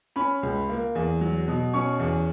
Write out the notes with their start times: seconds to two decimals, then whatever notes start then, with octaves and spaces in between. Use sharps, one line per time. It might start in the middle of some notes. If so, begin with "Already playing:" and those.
0.16 C#4 B5
0.43 C#2
0.69 A#3
0.95 E2
1.21 F#3
1.48 B2
1.73 C#4 C#6
1.99 E2